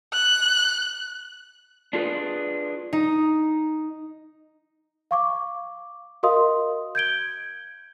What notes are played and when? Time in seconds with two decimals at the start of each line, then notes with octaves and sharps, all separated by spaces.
0.13 F#6
1.93 D4 F4 G#4 A4 B4
2.93 D#4
5.11 F5 C#6 D6
6.23 F#4 A#4 D#5 F5 C6 D#6
6.95 G6 G#6 D7 G7